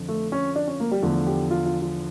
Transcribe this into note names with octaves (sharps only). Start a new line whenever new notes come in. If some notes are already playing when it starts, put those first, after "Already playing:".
Already playing: F2 D3 F3
A3
C#4
D4
C#4
A#3
G3
E2 D3 F3 A3
G4
F4
F4
F4